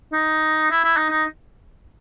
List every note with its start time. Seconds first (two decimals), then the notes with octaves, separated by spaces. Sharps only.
0.12 D#4
0.71 E4
0.84 E4
0.96 D#4
1.10 D#4